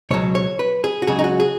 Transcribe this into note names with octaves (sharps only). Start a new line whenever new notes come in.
C#2 B2 F#3 C#5
C#5
B4
G#4
F#4
C#2 C#3 F#3 G#4
D#4
F#4
G#4